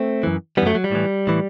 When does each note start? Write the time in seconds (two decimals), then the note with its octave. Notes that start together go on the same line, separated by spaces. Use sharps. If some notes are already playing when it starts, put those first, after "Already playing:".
Already playing: A3 C4
0.23 F#2 E3
0.57 E3 G3 B3
0.62 F#2 F#3 A3
0.75 F#3
0.84 G3
0.92 A2 E3
1.27 A2 E3